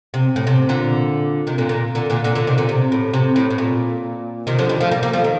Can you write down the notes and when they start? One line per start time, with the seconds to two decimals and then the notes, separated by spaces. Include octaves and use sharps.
0.14 C3
0.36 A2
0.47 C3
0.69 A#2 D3
1.47 C3 D#3
1.58 A#2 D3
1.69 A#2
1.95 A#2 D3
2.10 A#2 D3
2.24 A#2 D3
2.35 A#2 D3
2.47 C3 D#3
2.58 A#2 D3
2.69 C3
2.92 A2
3.13 C3
3.36 A2
3.50 A2
3.58 A#2
4.47 C3 D#3
4.58 D3 F3
4.69 D#3 G3
4.80 F3 A3
4.91 G3 A#3
5.03 G3 A#3
5.13 F3 A3
5.24 D#3